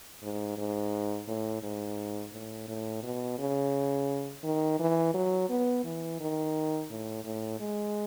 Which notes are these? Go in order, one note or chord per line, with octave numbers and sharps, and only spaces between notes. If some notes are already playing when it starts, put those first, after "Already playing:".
G#2
G#2
A2
G#2
A2
A2
B2
C#3
D#3
E3
F#3
B3
E3
D#3
A2
A2
G#3